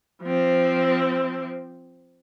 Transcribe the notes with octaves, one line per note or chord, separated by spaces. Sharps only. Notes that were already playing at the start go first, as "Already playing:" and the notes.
F3 C4